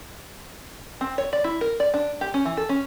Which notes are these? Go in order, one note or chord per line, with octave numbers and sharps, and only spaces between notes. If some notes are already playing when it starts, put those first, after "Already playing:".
C4
C#5
D5
E4
A#4
D5
D4
G4
C#4
E3
A4
C#4